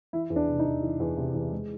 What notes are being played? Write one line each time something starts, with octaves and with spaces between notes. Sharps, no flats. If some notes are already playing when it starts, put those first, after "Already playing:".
E3 E4
E2
D4
C3
D#4
E2
E3
E2
C3
E2
G#3